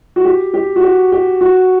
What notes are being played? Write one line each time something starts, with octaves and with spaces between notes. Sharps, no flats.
F#4
G4
G4
F#4
G4
G4
F#4